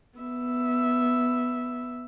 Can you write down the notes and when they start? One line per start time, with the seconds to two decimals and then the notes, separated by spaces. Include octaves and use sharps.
0.19 B3 E5